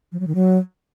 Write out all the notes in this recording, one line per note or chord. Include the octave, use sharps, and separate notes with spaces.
F3
F#3
D#3
F#3